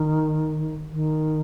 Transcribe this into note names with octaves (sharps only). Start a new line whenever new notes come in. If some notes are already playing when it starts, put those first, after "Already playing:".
Already playing: D#3
D#3